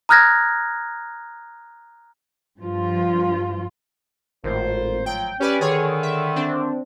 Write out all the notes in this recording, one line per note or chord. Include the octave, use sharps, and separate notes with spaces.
A#5 D#6 F6 F#6 G#6 A#6
G2 F3 F4
G#1 A2 A#3 F4 C5
F3 F#3 G5
C#4 G4 B4 D5
D3 D#3 G#4 C#5
E5
C4 D4